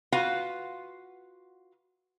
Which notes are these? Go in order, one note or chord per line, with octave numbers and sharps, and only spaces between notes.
F4 F#4 B4 F5 F#5